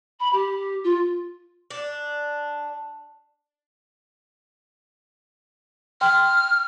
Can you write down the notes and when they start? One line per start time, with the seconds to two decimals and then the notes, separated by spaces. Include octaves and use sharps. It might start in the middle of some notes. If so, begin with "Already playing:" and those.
0.19 B5
0.32 G4
0.84 F4
1.70 D4
6.01 G5 C6 F6